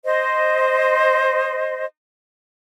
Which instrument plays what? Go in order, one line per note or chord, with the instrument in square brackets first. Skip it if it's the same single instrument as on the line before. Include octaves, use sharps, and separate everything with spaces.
[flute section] C5 D#5